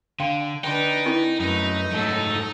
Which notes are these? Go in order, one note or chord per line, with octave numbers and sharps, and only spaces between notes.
D3 F5 G5 C6
D3 D4 D#4 B4 G5 C6
C4 E4 A#4
F#2 A3 D#4 B4
G#2 F#3 A3 A4